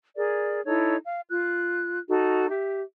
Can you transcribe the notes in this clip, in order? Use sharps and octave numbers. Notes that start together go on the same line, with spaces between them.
G#4 A#4 D5
D#4 E4 A4 C#5
F5
F4 F#6
D#4 F#4 A4
G4 E5